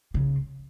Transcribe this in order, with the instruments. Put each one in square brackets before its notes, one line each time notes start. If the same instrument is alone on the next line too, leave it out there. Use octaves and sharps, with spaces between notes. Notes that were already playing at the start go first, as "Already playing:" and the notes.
[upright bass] C#3